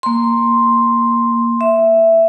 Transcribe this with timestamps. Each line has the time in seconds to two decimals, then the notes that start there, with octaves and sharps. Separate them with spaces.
0.03 A#3 C6
1.61 E5